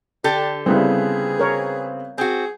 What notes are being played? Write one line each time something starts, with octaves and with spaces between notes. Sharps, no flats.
D3 D4 G4 A4
C#3 G3 B3 C4 E4 G#4
A#4 C#5
C4 F#4 G#4